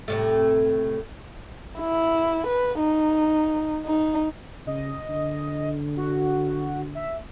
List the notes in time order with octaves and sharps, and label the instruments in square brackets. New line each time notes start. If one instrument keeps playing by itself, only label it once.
[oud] A2 C3 A3
[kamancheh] E4
B4
D#4
D#4
[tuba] C#3 [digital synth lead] D#5
[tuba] D3
[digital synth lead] F#4
E5